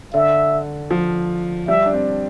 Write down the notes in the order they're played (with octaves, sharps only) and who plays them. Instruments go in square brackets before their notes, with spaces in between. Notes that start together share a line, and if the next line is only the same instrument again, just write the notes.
[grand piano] D3 [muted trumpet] E5
[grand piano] F3
[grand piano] G3 [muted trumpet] E5
[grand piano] D4
C4